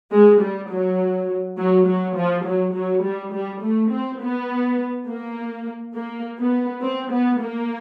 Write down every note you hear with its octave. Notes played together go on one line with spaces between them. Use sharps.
G#3
G3
F#3
F#3
F#3
F3
F#3
F#3
G3
G3
A3
C4
B3
A#3
A#3
B3
C4
B3
A#3